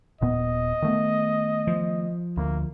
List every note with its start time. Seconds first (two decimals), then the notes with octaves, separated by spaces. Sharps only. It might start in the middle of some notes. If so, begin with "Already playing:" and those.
0.21 D#1 A#2 B3 D#5
0.82 D#3 A3 B3
1.67 F3
2.37 D2 A#3